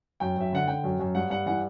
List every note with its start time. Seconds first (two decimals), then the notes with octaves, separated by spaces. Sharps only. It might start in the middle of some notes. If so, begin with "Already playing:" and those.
0.20 F#2 G5
0.37 F#2 E5
0.53 D3 F#5
0.68 D3 G5
0.84 F#2
0.99 F#2
1.15 G2 F#5
1.30 G2 F#5
1.46 E3 F#5